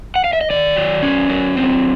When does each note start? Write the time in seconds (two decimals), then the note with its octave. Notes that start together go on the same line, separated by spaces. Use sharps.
0.15 F#5
0.24 F5
0.33 E5
0.41 D#5
0.50 D#3 D5
0.76 F#3
1.02 C#4
1.29 F#3
1.56 C4